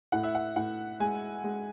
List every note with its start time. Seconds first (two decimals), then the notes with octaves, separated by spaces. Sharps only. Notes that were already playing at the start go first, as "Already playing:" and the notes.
0.12 A2 F#5
0.23 E5
0.35 F#5
0.56 A2 F#5
1.00 G#3 G#5
1.44 G#3